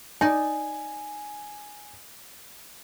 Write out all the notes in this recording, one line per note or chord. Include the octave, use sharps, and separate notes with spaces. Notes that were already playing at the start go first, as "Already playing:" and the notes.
D#4 D5 G#5